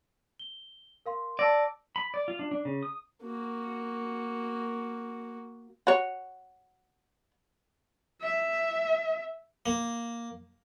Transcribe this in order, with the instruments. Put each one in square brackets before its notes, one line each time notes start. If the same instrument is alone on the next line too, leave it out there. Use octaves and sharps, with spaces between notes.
[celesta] G7
A#4 F5 C6
[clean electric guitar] D5 [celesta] A5 E6 A#6
[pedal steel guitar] B5
D5
F4
D4
D4
C#3
D#6
[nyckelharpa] A#3 F#4
[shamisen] F#4 C#5
[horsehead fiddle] E5
[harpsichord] A#3